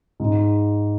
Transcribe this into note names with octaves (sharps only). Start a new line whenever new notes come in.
G#2